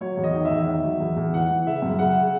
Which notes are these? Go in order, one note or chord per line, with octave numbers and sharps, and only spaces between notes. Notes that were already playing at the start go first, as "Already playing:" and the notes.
F#3 C#5
E2
D#5
D#3
E5
E2
D#3
F#3
E2
E2
E3 F#5
E3
C#3 E5
F#2
C#3 F#5